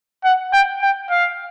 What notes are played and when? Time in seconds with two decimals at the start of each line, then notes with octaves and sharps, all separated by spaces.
0.24 F#5
0.52 G5
0.82 G5
1.10 F5